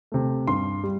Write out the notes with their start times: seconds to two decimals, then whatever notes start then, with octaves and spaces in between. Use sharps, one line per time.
0.12 C3 A3
0.47 G2 C6
0.84 G3